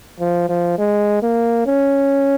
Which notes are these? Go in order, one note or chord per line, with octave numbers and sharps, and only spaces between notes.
F3
F3
G#3
A#3
C#4